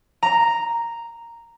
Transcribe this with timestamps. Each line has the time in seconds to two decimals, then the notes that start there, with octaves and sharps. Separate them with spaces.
0.23 A#5